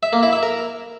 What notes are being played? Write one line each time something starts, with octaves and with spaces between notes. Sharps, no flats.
E5
A#3
E4
E5
A#4